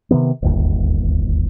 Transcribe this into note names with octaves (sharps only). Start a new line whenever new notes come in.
C3 D#3 G#3 B3
D1 G1 D#2